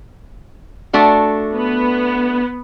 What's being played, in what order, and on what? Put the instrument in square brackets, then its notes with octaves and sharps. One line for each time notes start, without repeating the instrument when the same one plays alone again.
[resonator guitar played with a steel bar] A3 D4 F#4
[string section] B3